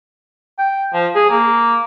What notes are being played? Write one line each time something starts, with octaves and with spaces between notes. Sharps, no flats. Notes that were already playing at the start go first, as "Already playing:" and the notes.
G5
F3
G#4
A#3